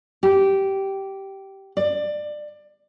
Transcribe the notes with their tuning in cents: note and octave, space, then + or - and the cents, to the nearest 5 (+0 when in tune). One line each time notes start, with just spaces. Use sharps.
G4 -15
D5 +25